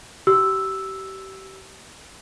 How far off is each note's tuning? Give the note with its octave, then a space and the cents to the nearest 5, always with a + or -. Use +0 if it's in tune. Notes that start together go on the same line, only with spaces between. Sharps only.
G4 -30 E6 +0